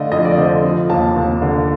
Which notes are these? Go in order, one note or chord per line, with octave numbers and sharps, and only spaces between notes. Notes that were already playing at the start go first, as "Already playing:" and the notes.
Already playing: D3 A3 D5 D#5 F5
F2 D#5
D5
D3 C5 D#5
F3
D#2 F5 A5
D#2
D3